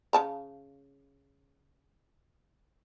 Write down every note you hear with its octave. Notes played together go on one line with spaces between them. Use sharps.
C#3 A5 A#5